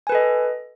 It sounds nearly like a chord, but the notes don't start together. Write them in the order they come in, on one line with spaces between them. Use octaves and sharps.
G#5 B4 A4 D#5